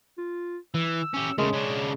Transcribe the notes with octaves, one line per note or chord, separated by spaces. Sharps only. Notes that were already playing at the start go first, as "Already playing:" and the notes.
F4
E3 E6
C#4 G4
C#3 G#3 A3 A#4
C#3 D4 C#5